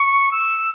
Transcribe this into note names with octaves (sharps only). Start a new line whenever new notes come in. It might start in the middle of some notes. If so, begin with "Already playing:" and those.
Already playing: C#6
E6